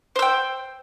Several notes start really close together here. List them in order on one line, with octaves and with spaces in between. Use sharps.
C5 E6 G5